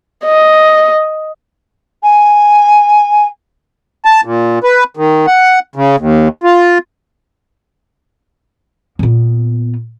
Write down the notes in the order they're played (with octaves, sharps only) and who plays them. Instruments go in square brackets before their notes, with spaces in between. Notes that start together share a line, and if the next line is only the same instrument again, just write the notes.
[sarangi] D#5
[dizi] G#5
[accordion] A5
A#2
B4
D#3
F#5
C#3
D#2
F4
[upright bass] A#2 B3